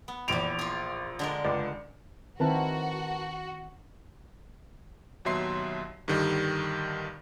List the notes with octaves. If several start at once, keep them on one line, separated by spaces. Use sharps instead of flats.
B3
A#1 E2 G4 D7 F7
F4 G#4
D3 G#3 A#4
C#2 D5
D#3 C4 E4 F#4 A#4 B4 A5
D#2 B2 F#3 E5 C6 C7
G2 D3 D#3 G3